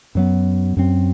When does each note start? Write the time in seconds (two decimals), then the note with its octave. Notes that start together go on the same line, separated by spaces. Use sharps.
0.15 F#2 F#3 B3
0.77 F#2 F#3 C4